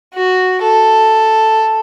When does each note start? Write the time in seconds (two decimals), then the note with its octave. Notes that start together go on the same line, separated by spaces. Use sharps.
0.14 F#4
0.62 A4